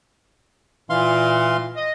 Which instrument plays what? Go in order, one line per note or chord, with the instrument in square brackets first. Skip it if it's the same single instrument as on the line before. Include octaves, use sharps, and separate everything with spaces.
[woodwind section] A#2 [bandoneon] E3 F5 C6
[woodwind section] D#5